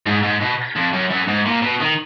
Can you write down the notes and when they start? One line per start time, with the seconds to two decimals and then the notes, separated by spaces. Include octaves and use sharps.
0.06 G#2
0.23 G#2
0.41 B2
0.76 F2
0.93 F#2
1.11 F#2
1.28 G#2
1.46 A#2
1.62 B2
1.81 D#3